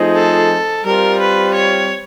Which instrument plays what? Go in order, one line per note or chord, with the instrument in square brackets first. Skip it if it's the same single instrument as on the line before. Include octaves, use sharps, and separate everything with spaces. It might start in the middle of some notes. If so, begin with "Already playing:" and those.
Already playing: [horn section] F3 A3 C4 D#4 G#4
[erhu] A4
[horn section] G3 C4 F4 [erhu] A#4
[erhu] B4
C#5